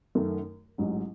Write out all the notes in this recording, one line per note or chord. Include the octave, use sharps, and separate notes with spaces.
F#2 D#3 A3
A1 G#2 F#3